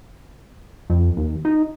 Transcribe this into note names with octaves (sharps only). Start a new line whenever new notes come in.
F2
D#2
D#4